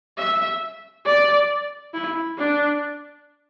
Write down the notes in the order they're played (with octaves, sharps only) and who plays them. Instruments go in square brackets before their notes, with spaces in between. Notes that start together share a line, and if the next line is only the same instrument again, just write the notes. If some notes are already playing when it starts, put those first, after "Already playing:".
[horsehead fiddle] E5
D5
E4
D4